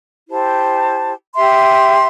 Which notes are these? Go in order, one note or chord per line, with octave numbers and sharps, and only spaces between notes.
E4 G4 C5 A5
G4 E5 C6